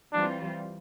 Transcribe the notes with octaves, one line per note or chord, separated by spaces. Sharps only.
E3 G3 C4 D4 F4